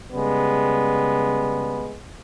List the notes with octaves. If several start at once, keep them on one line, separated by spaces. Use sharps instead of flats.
C#3 G3 G#3 B3